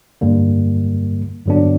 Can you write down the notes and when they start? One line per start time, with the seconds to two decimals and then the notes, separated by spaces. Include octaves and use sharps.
0.21 G2 D3 G3 A#3
1.45 G2 D3 F#3 B3 D4